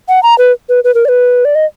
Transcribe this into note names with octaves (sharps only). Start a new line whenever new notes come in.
F#5
A#5
B4
B4
B4
A#4
D5
B4
D5
D#5